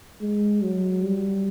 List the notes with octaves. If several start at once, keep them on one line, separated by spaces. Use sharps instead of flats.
G#3
F#3
G3